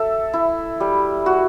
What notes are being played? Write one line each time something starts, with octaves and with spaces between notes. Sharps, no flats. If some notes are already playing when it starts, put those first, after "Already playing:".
Already playing: A4 E5
E4
G3
F#4